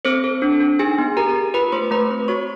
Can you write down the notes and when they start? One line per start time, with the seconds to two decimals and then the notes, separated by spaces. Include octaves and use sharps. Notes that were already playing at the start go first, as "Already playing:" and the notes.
0.05 C4 A4 C5
0.24 A4
0.42 D4
0.60 D4
0.79 D#4 G#4 G#5
0.98 B3
1.17 G4 A#4 A#5
1.36 G4
1.54 F4 B4 B5
1.72 A3 C5 C6
1.91 A3 B4 B5
2.10 C4
2.28 F#4 C#5 C#6